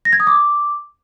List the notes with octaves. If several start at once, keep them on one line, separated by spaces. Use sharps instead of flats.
A#6
G#6
D#6
D6